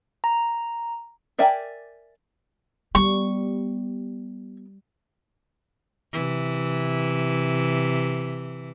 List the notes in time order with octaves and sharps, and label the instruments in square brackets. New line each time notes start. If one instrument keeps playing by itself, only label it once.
[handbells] A#5
[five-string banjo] A#4 D5 E5 G5 G#5
[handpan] G3 [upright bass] B3 [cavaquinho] C#6
[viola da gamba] C3 E3